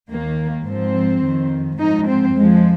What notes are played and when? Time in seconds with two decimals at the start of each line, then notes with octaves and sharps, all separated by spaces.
0.10 D#2 D#3 A#3
0.67 G#2 F3 C4
1.24 F2 D#3
1.79 G#2 F3 D#4
2.08 C4
2.36 F2 F3 G#3